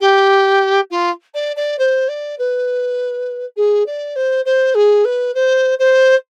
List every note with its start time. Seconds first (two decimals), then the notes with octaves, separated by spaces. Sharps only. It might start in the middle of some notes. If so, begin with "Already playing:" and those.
0.01 G4
0.90 F4
1.34 D5
1.56 D5
1.79 C5
2.08 D5
2.39 B4
3.56 G#4
3.86 D5
4.16 C5
4.45 C5
4.75 G#4
5.05 B4
5.34 C5
5.79 C5